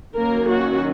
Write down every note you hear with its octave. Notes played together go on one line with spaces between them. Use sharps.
D#3 F#3 A#3 C#4 A#4
F#4